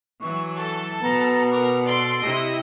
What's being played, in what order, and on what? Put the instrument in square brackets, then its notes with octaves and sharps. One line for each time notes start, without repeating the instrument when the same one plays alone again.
[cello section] E3 F#3 [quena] C#6
[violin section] A4
[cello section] B2 [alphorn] B3 [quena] A#5
[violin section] A#4 [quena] D6
[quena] A4 [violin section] D5 C6 D7
[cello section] C3 E4 [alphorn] G4 [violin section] D#5